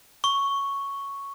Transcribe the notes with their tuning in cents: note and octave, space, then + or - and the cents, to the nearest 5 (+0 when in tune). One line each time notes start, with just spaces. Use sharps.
C#6 +0